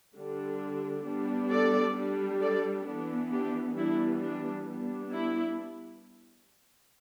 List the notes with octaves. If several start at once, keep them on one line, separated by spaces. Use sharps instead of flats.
D3 G3 D4
G3 B3 D4
A4 D5
G3 D4
A4 D5
E3 B3 D4
D4 G4
E3 G3 B3 D4 E4
D4
G3 B3 D4
E4